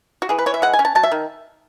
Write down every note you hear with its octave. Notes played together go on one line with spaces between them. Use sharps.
F#4
E3 G#4
B4
E3 C#5
E5
G#3 F#5
G#5
C#4
A5
F#3 A5
E5
D#3